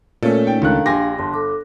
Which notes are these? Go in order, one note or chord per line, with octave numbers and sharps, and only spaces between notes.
A#2 A3 C#4 A4
D#4 G5
C#2 D#3 D4 A#4 F5 F#6
A#1 G4 G#5 C6 A#6
G1 A5 C6
A4 D6